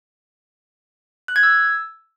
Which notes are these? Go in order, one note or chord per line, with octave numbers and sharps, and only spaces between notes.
F#6
G#6
E6